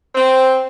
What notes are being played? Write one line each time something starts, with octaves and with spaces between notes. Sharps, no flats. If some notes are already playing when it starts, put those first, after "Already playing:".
C4